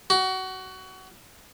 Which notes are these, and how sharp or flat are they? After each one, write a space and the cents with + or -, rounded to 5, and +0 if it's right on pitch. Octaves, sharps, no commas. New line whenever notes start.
F#4 +25